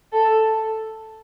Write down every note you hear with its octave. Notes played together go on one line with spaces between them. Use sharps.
A4